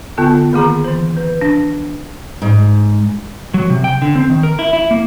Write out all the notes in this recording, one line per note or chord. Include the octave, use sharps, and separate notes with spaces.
D3 B3 F4 A5
D#3 A#3 G#4 A#5
E3 C5
B4
D4
G#2
F#3
C3
G5
D3
C4
D#3
A#4
E4
E4
A#3